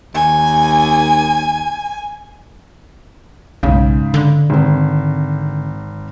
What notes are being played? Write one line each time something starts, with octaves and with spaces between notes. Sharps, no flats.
D#2 G#5
B1 G#2 C#3
D3
G#1 C4